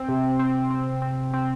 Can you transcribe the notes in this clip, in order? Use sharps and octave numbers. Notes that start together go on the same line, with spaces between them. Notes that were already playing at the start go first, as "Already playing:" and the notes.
Already playing: C4
C3
C4
C4
C4
C4